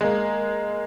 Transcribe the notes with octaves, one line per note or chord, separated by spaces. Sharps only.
G#3 A#3